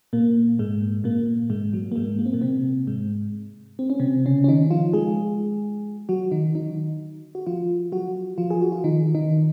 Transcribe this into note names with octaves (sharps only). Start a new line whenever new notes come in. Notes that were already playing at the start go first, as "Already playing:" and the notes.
A#2 A#3
G#2 G#3
A#2 A#3
G#2 G#3
F#3
A#3
G#2 G#3
A#3
C4
A#2 A#3
C3 C4
G#2 G#3
C4
C#4
C3 C4
C#3 C#4
C#4
D#3 D#4
F3 F4
G#3 G#4
F#3 F#4
D#3 D#4
D#3 D#4
F#4
F3 F4
F#3 F#4
F3 F4
G#4
F#4
F4
D#3 D#4
D#3 D#4